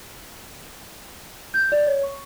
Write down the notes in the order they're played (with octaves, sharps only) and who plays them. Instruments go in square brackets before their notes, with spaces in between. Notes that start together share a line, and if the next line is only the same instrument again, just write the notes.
[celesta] G6
D5
C#5
C#6